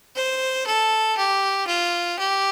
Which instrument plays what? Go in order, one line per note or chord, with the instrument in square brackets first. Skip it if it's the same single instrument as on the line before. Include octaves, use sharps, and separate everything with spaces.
[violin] C5
A4
G4
F4
G4